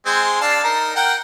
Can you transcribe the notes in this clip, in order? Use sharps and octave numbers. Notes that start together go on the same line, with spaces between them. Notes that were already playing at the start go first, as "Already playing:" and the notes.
G#3 C4
D4 F5 A5
D#4 A#4
A#4 F#5 G5